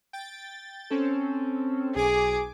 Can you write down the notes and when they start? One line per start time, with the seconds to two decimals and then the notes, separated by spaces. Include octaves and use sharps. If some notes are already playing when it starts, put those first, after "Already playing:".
0.13 G5 A6
0.90 C4 C#4 A4
1.95 B1 G#4 G#5 D6